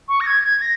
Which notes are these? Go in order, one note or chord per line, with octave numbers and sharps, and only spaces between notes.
C#6
A#6
G#6
G#6
A#6